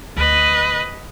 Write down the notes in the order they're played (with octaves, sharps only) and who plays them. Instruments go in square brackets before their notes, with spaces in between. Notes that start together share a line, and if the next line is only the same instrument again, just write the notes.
[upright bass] D2 [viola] B4 D#5